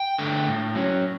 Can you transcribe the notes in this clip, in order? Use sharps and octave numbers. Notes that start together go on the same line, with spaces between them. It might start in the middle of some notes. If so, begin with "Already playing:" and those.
Already playing: G5
D3 A3
A2
F#3 C#4